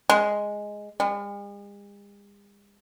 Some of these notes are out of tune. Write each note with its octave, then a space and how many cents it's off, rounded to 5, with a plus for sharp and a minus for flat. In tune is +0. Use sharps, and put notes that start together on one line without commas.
G#3 +0
G#3 -45